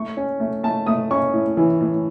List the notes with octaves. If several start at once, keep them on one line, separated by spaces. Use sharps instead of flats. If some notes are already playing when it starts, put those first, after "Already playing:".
Already playing: A3 C#6
C#4
A3
A3 A5
A3 D#6
C#4 C#6
A2
E3
A2